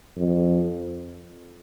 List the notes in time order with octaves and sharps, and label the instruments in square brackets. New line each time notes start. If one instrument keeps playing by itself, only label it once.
[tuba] F2